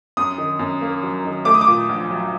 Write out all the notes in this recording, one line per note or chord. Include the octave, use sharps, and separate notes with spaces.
F#2 D#6
D#3
F#2
A#3
F#3
D#3
A3 D6
D#6
D6
A#2
A#1
F#3